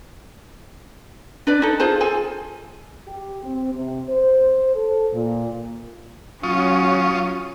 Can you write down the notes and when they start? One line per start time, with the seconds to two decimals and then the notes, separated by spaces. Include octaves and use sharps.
1.47 D4 B4 D5
1.62 D#4 A4
1.80 F4 G#4 C5 A5
2.00 F4 G#4 A4 G#5
3.08 G4
3.44 C4
3.75 C3
4.09 C5
4.76 A4
5.13 A#2
6.43 F#3 C#4 F4 C#6 D#6